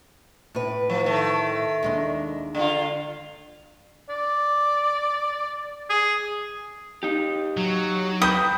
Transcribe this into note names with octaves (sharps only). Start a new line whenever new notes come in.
A2 B4
F3
D#3 A3
D#2 G#3 D4
D3 F4
D5
G#4
D#4 G4
F#3
B4 G5 B5 D#6 G6